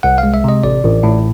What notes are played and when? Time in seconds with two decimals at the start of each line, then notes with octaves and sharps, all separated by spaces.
0.03 C2 F#5
0.18 F5
0.23 G#3
0.34 E5
0.44 C3 D#5
0.64 A1 D5
0.84 A1
1.03 A2